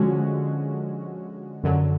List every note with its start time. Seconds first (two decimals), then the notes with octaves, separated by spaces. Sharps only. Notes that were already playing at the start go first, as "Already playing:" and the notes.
Already playing: D3 F3 G#3 C#4 F#4
1.64 F#2 D3 F#3